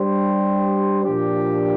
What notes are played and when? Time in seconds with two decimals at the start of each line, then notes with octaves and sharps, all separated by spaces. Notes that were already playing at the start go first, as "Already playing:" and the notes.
Already playing: G3 D4 G4 C5
1.04 A#2 F3 D4 G4